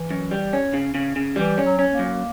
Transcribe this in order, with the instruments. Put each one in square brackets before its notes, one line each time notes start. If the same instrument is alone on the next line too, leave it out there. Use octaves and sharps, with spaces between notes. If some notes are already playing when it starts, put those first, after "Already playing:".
Already playing: [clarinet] E3
[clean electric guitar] F#2
G3
C#4
C#3
C#3
C#3
[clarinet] E3 [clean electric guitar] G3
[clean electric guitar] C#4
[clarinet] F#3
[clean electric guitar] C#4
[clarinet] A#3
[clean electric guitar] F#2